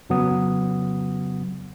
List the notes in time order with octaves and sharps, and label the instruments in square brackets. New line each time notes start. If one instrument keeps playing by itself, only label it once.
[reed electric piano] F2 C#3 F#3 B3 F#5 D#6